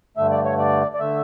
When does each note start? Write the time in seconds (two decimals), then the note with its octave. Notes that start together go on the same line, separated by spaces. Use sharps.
0.17 G2 D3 A3 E5
0.31 D5
0.45 C#5
0.59 D5
0.94 D5
0.99 D3 A3 E5